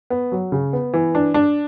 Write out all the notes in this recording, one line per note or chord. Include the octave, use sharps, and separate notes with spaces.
B3
F#3
C#3
B3
E3
D4
D4